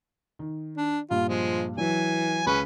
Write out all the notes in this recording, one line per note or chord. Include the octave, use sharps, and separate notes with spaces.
D#3
D4
G2 A#2 F4
F3 G#3
E3 F#3 G#5
C#2 C#4 B4